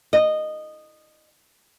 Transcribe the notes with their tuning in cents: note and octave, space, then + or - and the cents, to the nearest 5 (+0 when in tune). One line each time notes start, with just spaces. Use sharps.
D#5 -15